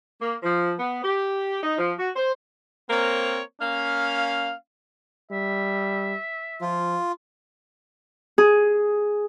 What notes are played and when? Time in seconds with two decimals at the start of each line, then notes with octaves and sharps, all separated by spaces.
0.21 A#3
0.43 F3
0.78 B3
1.03 G4
1.63 D#4
1.78 F3
1.99 F#4
2.15 C5
2.90 A#3 C4 A#4 C5 C#5
3.60 A#3 C#4 F5
5.31 G3 E5
6.61 F3 F4
8.38 G#4